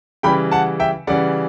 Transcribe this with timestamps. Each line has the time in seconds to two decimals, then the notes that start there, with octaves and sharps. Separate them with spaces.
0.23 C#3 E3 G3 G5 B5
0.51 F#5 A5
0.80 E5 G5
1.07 C#3 E3 G3 D5 F#5